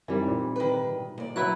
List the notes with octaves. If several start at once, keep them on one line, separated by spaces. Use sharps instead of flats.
F#2 E3 G3 C4 D#4
A#2
D#3 B4
G#2 B2
D#2 D5
F#3 E4 B4 F#6